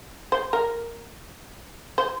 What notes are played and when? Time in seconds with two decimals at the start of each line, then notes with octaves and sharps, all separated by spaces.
0.32 C5
0.53 A#4
1.98 C5